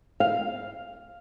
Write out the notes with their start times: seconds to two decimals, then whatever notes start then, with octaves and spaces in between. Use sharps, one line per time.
0.20 F5